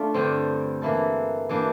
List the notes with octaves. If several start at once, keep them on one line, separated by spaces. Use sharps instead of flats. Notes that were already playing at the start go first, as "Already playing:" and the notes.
Already playing: A3 D4 F4
G2 D3 G3 C4
E3 A#3 E4 A4
E3 G3 A#3 D4